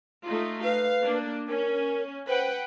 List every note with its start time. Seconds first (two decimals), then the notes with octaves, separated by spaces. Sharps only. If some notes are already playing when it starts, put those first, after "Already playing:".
0.25 A3 D#4 F4
0.64 B4 F5
1.03 A#3 D4
1.48 C#4 A#4
2.28 B4 C5 F#5 G5